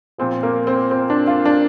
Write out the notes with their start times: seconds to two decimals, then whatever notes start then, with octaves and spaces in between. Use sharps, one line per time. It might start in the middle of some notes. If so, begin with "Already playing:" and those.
0.18 A#2 F3 C4
0.43 A#3
0.67 C4
0.91 C4
1.10 D4
1.27 F4
1.45 D4